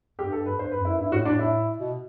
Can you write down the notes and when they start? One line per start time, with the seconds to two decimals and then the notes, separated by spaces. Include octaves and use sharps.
0.19 G2 G4
0.32 A4
0.46 B4
0.58 G2 C5
0.71 B4
0.78 F#2
0.85 E4
0.99 G2 E4
1.12 A2 F#4
1.25 A2 D4
1.39 E4
1.78 B2